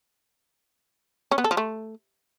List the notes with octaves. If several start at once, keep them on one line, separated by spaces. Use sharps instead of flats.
C#4
B3
A4
F3
A3